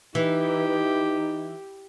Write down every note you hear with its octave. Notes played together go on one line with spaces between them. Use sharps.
E3 D#4 G4